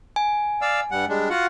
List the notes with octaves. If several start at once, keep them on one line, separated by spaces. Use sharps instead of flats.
G#5
D5 F5 E6
G2 G3 F#5
G3 G#3 D4
F4 F#4 F#5